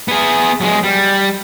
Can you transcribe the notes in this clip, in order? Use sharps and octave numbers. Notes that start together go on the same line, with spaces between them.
B3 G#4
F#3 G#3
G3